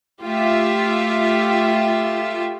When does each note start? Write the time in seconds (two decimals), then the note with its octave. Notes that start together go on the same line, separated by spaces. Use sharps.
0.21 A3 F4 G4 E5